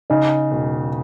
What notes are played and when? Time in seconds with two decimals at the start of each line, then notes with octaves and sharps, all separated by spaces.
0.10 C#3 D#4
0.51 E1